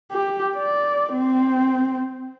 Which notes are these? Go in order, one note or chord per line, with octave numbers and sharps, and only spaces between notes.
G4
D5
C4